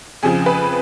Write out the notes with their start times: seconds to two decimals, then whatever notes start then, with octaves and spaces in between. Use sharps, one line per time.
0.23 F2 C#3 F3 G#4
0.46 B4